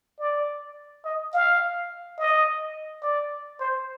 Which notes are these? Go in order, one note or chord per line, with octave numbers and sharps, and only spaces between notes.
D5
D#5
F5
D#5
D5
C5